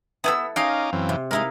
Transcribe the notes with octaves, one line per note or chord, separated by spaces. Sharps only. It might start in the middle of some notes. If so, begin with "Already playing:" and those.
B3 E4 A4 G#5 E6
C#4 D#4 G#4 D#5 F5 G5 D6
F#2 E3 C4
C3
G#3 D#4 E4 A#4 F5